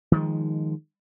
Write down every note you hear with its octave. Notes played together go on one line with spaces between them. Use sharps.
D#3 F3 G#3